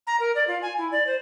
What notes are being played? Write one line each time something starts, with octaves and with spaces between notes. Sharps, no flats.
A#5
A#4
D5
F4
G#5
E4
D5
C5